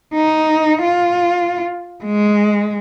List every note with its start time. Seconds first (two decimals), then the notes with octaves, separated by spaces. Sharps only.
0.15 D#4
0.83 F4
2.04 G#3